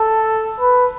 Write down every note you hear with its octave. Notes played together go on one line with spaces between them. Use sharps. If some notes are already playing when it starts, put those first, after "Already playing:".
Already playing: A4
B4